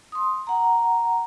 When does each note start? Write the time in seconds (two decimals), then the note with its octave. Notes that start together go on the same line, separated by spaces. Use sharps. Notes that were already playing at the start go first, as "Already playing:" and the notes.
0.12 C6 D#6
0.47 F#5 A#5